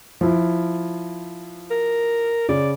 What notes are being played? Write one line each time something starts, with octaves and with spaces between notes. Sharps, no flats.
F3 E4
A#4
C#3 D5